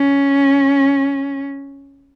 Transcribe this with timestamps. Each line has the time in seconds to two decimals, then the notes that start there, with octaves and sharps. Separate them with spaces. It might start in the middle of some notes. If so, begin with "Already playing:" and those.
Already playing: C#4